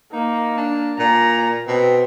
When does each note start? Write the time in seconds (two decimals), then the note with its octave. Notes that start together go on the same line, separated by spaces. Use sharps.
0.13 A#3 D#4
0.57 D4
0.99 A#2 A#5
1.68 B2 C4